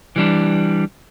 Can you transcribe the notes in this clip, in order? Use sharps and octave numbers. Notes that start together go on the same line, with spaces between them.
E3 G3 D4